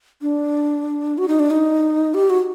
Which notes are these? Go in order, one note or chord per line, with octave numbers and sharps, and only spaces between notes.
D4
F#4
D#4
D4
D#4
G4
F#4